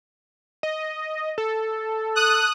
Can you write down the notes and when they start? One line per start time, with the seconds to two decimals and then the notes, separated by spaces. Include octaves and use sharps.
0.63 D#5
1.38 A4
2.16 D#6 F#6